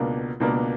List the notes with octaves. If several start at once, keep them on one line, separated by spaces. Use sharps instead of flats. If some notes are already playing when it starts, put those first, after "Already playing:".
Already playing: C#2 B2 A#3 D4 A#4
C#2 B2 A#3 D4 A#4